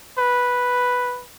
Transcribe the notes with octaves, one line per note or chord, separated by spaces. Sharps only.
B4